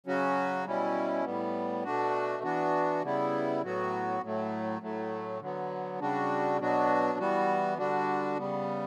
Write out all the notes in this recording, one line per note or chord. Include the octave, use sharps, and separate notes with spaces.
C#3 F#3 C#4 F#4
B2 G3 C#4 E4
A2 G3 B3
B2 A3 D4 F#4
E3 B3 D4 F#4
C#3 G3 B3 E4
A2 F#3 B3 F#4
A2 F#3 A3
A2 F#3 A3
D3 F#3 B3
C#3 G3 D4 F#4
B2 F#3 B3 D4 F#4
E3 G3 B3 F#4
D3 G3 D4 F#4
C#3 G3 B3